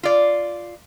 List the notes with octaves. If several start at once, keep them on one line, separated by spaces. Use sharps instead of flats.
F4 D5